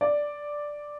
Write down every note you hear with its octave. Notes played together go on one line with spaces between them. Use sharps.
D5